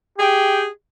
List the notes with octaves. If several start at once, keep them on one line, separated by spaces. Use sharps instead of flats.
G4 G#4 G5